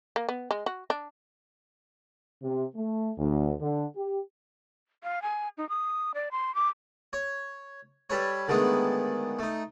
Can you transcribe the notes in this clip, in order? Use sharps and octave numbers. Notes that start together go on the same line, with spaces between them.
A#3
B3
G#3
F#4
D4
C3
A3
D2
D3
G4
F5
G#5
D#4
D#6
D5
C6
D6
C#5
G3 A4 B4 C#5
D3 D#3 G#3 A3 B3
A3 D#4